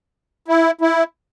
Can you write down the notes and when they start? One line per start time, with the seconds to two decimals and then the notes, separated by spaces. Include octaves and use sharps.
0.48 E4
0.81 E4